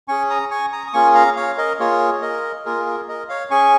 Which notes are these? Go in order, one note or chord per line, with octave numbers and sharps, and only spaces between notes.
C#4 G#4 G#5 C#6
A#5 D#6
G#5 C#6
A#5 D#6
D#6
A#3 C#4 F4 G#4 G#5 C#6
F5 A#5
C#5 F5
A#4 D#5
A#3 F4 G#4 C#5
A#4 D#5
A#3 F4 G#4 A#4
A#4
A#4 D#5
C#5 F5
C#4 G#4 G#5 C#6